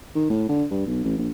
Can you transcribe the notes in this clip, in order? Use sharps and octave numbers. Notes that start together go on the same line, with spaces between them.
D#3
A2
D3
G2
B1
A1
A#1